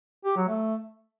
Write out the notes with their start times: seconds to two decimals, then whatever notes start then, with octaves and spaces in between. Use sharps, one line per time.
0.25 G4
0.37 F#3
0.48 A3